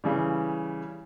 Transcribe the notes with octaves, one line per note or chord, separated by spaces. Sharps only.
C#3 E3 G3